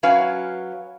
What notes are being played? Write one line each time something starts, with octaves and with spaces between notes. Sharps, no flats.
F#3 C#4 B4 F5